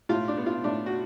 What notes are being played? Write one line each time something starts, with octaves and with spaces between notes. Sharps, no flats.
A2 F4
D4
B3
F4
A2 D4
F#4